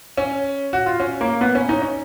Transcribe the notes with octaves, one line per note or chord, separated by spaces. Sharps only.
C#4
F#4
F4
C#4
A#3
B3
C#4
D#4
C#4